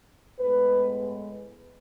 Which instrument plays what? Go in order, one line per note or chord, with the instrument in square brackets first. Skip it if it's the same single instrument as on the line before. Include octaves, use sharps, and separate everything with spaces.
[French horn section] A2 G#3 B3 B4